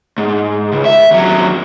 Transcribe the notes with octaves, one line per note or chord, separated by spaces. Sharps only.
G#2
C#2
E5
D#2 F#3